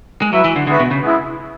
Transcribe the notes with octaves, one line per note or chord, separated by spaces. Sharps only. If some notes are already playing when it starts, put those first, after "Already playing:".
G#3
F#3 E4 B4 E5
E3
D3
D3 G#3 B3 F#4 B4 E5
B2
C#3
G#3 B3 E4